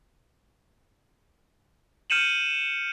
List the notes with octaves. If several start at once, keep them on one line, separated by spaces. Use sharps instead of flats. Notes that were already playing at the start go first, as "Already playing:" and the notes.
F6 G6 C#7 D#7 E7 F#7